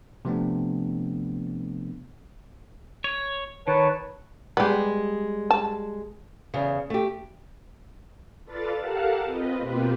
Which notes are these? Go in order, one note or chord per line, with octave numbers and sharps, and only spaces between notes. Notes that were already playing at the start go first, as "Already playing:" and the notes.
C3 F3 A3 B3 C4 D4
C#5
D#3 B4 C#5 A5
G3 G#3 B3 G4
A5
E2 C#3
A3 G4
F4 A4 B4 D5 F5 A6
G4 A4 A#4 F5 F#5 A5
C4 F4 B4 D#5
B2 A#3 C4 F4 G4 B4